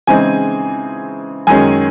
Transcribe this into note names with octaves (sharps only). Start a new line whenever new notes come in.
C#3 E3 G#3 C4 D#4 G#5
F#2 D#3 G#3 C#4 G#5